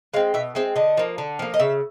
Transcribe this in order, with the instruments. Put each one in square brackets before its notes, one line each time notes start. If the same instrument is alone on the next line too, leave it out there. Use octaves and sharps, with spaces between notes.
[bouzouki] G#3 C4 F5
B2 E5
G#3 C4 E5
D3 D#5
F3 A#3
D3
F3 A#3
D#5
C#3 E5